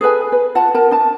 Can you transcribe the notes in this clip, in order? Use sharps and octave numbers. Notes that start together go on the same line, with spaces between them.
G#4 A4 B4 G#5
B4
F4 F#5 A5
A#4 A5
D4 A5